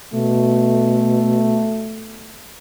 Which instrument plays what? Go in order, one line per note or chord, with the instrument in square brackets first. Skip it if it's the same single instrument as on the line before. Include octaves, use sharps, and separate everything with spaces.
[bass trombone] B2 [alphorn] A3